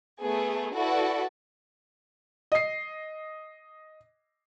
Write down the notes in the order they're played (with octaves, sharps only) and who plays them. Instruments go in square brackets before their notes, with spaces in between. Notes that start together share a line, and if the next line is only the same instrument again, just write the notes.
[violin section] A3 B3 G#4
E4 F#4 A4 B4 D5 F#5
[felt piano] D#5 C7